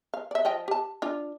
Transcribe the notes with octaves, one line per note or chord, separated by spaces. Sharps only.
F5
D5 E5
F3 D#5 G5
G4 A5
D4 F4